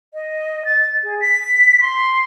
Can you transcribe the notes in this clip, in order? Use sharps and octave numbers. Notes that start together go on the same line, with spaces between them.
D#5
A6
G#4
B6
C6